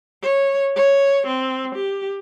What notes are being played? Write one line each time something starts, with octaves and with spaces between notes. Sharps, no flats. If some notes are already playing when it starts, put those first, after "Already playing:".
C#5
C#5
C4
G4